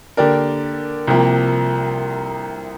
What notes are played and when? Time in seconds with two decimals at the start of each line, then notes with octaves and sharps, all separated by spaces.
0.17 D3 A#3 G4 A#4 D5
1.07 C2 C3 F3 A#3